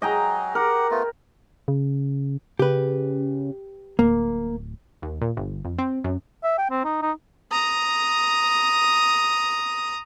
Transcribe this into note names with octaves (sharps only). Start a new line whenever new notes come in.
F#3 G#4 D#5 G5 A#5
G4 A#4 F#5
A3 B3 F4
C#3
C#3 G4 B4
D1 A#3
D#2
A#2
G1
F2
C4
F#2
E5
G5
C4
D#4
D#4
A#5 D#6